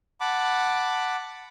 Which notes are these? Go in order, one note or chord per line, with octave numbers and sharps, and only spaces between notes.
F#5 A5 B5 D6